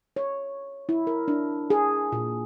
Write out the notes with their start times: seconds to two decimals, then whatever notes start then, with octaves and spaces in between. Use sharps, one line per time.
0.16 C#5
0.89 E4
1.07 A#4
1.28 D4
1.70 G#4
2.12 A#2